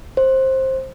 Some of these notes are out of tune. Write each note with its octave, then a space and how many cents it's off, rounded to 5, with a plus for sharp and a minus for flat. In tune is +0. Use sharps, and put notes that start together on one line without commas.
C5 +15